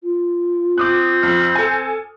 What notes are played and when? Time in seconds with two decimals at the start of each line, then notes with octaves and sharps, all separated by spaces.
0.03 F4
0.78 C4 D6 D#6 F#6
1.23 F2 F6
1.55 A4 G#5